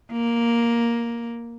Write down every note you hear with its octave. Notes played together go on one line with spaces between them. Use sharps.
A#3